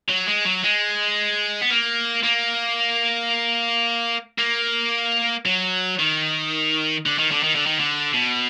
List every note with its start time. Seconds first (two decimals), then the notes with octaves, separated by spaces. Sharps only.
0.09 F#3
0.28 G#3
0.45 F#3
0.63 G#3
1.61 B3
1.70 A#3
2.24 A#3
4.39 A#3
5.46 F#3
5.99 D#3
7.06 D3
7.19 D#3
7.31 D3
7.43 D#3
7.55 D3
7.67 D#3
7.80 D3
8.14 B2